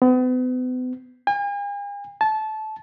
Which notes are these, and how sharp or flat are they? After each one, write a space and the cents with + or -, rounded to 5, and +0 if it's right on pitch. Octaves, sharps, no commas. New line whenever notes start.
B3 +40
G#5 -45
A5 -20